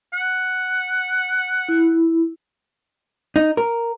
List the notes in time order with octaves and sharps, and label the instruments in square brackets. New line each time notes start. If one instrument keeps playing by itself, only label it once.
[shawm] F#5
[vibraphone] E4
[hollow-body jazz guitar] D#4
A#4